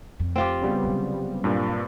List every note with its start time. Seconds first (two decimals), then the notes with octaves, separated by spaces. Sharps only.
0.19 F2
0.36 C4 F4 G4
0.62 C#3 G3 B3
0.83 C3 F#3
1.44 G2 A#2